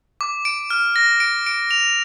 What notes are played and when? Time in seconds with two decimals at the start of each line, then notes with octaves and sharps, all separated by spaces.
0.21 D6
0.45 D7
0.70 F6
0.96 A#6
1.20 D7
1.46 D7
1.71 F7